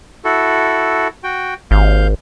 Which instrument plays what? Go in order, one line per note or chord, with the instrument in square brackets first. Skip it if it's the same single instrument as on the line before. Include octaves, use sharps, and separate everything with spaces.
[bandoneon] E4 F#4 A4
F#4 G5
[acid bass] G#1 [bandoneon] D#2 F5 G6